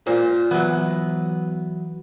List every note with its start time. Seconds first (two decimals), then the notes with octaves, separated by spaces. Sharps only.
0.07 A#2 C5 F5
0.51 E3 F#3 B3